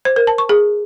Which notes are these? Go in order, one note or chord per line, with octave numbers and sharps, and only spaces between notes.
C5
A#4
A5
C#6
G#4